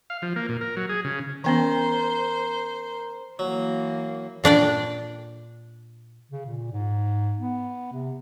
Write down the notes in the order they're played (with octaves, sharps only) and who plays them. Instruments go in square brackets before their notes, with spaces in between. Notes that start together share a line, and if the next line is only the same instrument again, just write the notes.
[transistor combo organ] F5
F3
A#3
A#2
A#4
F#3
G#4
C#3
[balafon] E3 B3 C#4 [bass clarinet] A#4 [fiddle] C5
[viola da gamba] E3 A#3 [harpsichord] F#3
[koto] A#2 D4 D5 G5
[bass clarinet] C#3
A#2
G#2
B3
C3